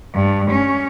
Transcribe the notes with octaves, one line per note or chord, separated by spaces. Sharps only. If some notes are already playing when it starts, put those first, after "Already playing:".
G2
C#4